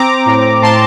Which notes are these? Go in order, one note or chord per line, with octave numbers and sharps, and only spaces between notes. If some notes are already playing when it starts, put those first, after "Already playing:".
Already playing: C4 A#5 D6
A2
A2 A5 C6